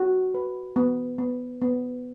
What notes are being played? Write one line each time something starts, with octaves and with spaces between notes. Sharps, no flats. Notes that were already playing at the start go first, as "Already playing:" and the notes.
Already playing: F#4
B4
B3
B3
B3